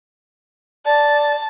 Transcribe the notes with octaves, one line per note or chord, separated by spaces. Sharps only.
D5 A5